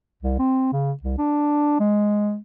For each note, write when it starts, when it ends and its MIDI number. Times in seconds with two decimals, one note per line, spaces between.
0.23 0.36 36
0.39 0.71 60
0.73 0.92 49
1.03 1.17 36
1.18 1.80 62
1.80 2.37 56